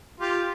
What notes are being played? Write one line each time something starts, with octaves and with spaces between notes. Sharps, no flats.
F4 G4